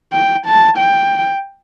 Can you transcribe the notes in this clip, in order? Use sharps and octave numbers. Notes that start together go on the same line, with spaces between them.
G5
A5
G5